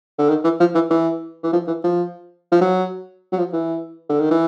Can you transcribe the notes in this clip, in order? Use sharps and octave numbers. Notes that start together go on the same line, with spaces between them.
D3
D#3
E3
F3
E3
E3
E3
F3
E3
F3
F3
F#3
F#3
F3
E3
D3
D#3
E3